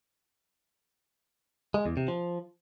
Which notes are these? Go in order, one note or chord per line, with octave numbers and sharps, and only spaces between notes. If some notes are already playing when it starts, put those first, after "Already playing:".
G#3
E2
C3
F3